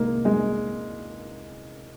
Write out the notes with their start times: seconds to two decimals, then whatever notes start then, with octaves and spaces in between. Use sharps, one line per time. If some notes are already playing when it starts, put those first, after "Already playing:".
Already playing: C2 C3 D#3 G#3 A#3
0.25 G#3